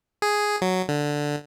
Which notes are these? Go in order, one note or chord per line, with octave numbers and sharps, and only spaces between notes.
G#4
F#3
D3